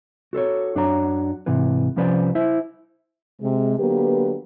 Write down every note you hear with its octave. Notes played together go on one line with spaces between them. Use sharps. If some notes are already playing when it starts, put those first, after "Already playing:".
F#4 A4 C5 C#5
F#2 D4 F#4 C#5 A#5
G#2 C3 E3 B4
C2 F3 C#4 B4 C5 D5
E4 C5 E5
C3 G#3
D3 F#3 A#3 B3 G4 B4